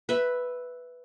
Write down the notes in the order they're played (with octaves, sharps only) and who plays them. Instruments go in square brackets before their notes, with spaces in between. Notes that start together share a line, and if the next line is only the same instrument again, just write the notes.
[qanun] B4 E5